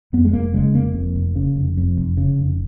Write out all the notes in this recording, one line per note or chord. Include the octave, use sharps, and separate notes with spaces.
F2 B3
G#3
F1 A#3
C#3 G#3
F1 A#3
F2
F1
C#3
F1
F2
F1
C#3
F1